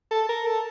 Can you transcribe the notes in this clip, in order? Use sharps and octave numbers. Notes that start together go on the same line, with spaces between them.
A4
A#4
A4